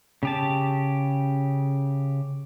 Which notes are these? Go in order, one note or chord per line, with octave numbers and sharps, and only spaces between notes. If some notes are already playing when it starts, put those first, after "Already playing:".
C#3 G4 A5